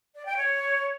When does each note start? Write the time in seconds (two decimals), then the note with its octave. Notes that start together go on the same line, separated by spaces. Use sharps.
0.14 D5
0.25 G5
0.36 C#5